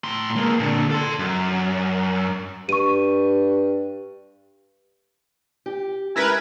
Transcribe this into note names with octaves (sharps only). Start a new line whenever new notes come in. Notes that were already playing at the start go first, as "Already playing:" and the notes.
A2 C6
G#3 A#3
A#2 D3
A4 C6
F#2
G2 C#6 D#7
G4
G#3 C#4 E4 A#4 B4 G#6